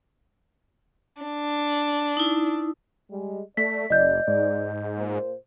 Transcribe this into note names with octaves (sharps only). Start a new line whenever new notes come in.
D4
D#4 E4
G3 G#3
A3 D5 B6
F#1 D#5 G6
G#2
A#2 A#3 C5